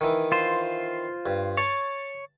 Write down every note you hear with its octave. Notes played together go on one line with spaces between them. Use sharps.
D#3 E3
F4 C5
G2
C#5 A5